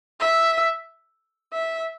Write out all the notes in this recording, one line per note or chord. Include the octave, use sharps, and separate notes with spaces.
E5
E5